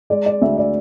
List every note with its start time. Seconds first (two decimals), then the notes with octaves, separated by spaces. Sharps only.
0.10 G#3 D5
0.26 D5
0.42 D2 E5
0.57 D5